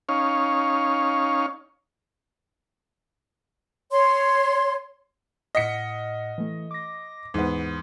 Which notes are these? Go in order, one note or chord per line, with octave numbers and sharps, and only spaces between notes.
C#4 D#4 C#5 F5
C#5 C6
A2 D#5 F#5 F6 B6 C#7
E3 A3
D6 A#6
D#2 G#2 E3 B3